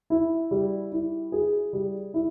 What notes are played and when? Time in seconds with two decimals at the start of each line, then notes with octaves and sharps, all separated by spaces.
0.10 E4
0.51 G3
0.92 E4
1.32 G#4
1.73 G3
2.14 E4